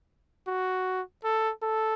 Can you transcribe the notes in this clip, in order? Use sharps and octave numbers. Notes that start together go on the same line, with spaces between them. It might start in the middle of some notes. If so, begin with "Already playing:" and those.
F#4
A4
A4